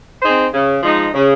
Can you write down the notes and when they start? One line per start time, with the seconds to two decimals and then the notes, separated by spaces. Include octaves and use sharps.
0.22 C4 D#4 G#4 C5
0.53 C#3
0.83 F3 G#3 D#4
1.14 C#3